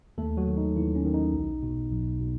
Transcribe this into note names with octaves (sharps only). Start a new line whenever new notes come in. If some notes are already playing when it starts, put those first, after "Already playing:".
D#2 A3 A4
F#3 F#4
D#3
D#4
D#2 E3 E4
C#4
D#3
D#4
B1
B2
B1
B2